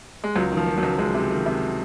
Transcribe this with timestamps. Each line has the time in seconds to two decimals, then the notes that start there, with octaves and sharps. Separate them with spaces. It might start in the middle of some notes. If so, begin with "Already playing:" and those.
0.24 G#3
0.36 C#2 F#3
0.52 D#3
0.57 F3
0.67 D#3
0.78 F#3
0.83 C#2
0.99 C#2 G#3
1.14 C3
1.30 D#3
1.46 C3